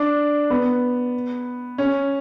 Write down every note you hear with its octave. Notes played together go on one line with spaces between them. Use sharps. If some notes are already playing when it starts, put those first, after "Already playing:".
Already playing: D4
B3
C#4